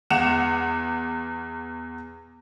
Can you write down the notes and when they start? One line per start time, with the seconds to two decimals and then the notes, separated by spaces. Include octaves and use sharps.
0.10 E2 F#5 E7 F7